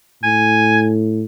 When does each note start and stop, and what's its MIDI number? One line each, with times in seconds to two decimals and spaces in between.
0.23 1.24 45
0.23 0.85 80